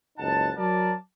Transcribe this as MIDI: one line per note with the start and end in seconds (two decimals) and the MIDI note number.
0.18 0.50 30
0.18 0.50 37
0.18 0.50 63
0.18 0.50 78
0.18 0.50 81
0.57 0.93 54
0.57 0.93 70
0.57 0.93 74
0.57 0.93 81